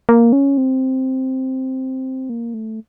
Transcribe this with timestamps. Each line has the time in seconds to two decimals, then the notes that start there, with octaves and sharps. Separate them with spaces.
0.09 A#3
0.33 C#4
0.58 C4
2.29 A#3
2.54 A3